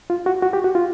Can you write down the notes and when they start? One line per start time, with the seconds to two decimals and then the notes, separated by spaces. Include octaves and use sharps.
0.10 F4
0.26 F#4
0.43 F#4
0.53 G4
0.64 F#4
0.75 F4